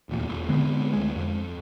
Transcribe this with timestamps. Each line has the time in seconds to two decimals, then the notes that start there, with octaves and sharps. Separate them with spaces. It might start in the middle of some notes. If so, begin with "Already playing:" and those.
0.09 D#1 E2 A#2
0.26 E1
0.49 D3 G#3 B3 C4
0.93 D2 G#3
1.16 F2